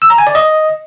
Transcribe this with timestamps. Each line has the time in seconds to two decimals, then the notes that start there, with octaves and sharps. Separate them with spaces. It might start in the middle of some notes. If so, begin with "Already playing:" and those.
0.02 E6
0.10 A#5
0.18 G#5
0.27 D5
0.35 D#5